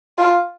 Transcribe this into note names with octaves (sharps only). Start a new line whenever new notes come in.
F4